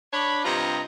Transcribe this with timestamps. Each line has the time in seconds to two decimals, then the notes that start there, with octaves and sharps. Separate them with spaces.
0.13 D4 C#5 B5
0.45 G2 C3 F4 C5 D#5 A#5